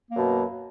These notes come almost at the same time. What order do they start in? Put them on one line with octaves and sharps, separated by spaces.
A#3 F#2 B2